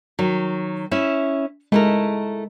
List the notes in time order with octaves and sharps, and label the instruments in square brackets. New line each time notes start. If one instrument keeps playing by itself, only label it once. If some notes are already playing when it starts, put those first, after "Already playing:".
[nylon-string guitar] D#3 F#3
C#4 E4 E5
[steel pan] G#3 [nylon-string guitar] A3 E4 A#4